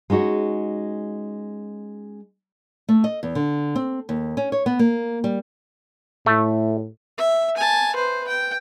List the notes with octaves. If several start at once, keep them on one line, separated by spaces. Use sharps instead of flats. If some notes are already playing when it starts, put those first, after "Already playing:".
G#3 C#4 D#4 F#4
A3
D#5
E2
D3
C4
D#2
C#4
C#5
B3
A#3
G3
A2 A3
E5
G#5 A5
B4 C5
G5